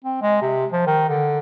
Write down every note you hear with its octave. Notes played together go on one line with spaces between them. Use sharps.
C4
G#3
C3
F3
D#3
D3